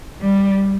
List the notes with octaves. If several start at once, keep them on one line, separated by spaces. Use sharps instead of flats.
G3